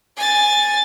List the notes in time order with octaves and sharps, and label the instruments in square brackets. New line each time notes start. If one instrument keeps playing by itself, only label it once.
[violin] G#5 A6